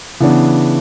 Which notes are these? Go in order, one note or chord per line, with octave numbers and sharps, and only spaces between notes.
C#3 E3 B3 D4